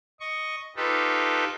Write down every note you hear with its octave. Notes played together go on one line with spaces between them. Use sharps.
D#5 C#6
D#4 F4 G4 A4 B4